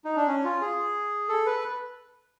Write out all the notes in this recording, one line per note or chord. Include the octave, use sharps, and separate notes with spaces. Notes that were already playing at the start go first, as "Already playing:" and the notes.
D#4
D4
C#4
F4
G#4
A4
B4